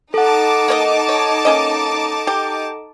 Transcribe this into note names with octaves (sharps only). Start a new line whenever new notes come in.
D#4 A4 F#5 A5 D6
A#3 C#5 D#5
C#5
A#3 C#4 D#5
G4